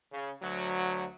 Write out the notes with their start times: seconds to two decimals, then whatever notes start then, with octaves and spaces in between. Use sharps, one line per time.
0.12 C#3
0.42 D2 F#3